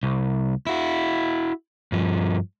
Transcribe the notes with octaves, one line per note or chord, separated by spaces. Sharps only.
C2
E4 F#4
G2 F3